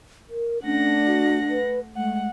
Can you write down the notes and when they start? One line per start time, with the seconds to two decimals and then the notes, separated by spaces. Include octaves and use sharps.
0.29 A#4
0.64 A3 C#4 D4 F#5 A#6
1.06 F#4
1.50 B4
1.95 G#3 A3 F#5